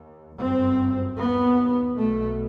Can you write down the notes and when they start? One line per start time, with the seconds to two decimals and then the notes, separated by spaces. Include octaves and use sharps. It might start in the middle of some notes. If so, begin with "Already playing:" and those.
Already playing: D#2
0.40 G1 F#2 C4
1.18 D#2 B3
1.96 B1 B2 A3